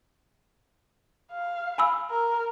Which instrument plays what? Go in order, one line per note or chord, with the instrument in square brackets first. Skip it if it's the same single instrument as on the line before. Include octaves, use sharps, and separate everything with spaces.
[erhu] F5
[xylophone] G#5 B5 E6
[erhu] A#4